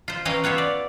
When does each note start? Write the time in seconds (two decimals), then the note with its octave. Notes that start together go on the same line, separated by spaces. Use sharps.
0.08 F4 C5
0.25 E3 C#4 D#5 F5 G5 A#5
0.44 B3 F4 G4 C#5 E5
0.58 D5